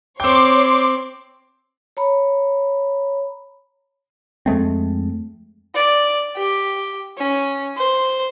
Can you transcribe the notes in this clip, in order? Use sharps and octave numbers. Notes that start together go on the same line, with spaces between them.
C4 C#5 G5 C6 D6
C#5 A#5 B5
F2 G#3 A3 C4
D5
G4
C#4
C5